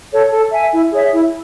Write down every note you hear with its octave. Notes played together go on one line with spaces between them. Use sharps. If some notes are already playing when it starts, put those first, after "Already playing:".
A4 C#5
A4
E5 G#5
E4
G#4 C#5 E5
E4